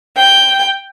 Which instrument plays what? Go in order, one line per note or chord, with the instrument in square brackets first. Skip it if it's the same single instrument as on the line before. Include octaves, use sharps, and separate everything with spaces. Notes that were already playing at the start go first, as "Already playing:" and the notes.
[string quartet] G5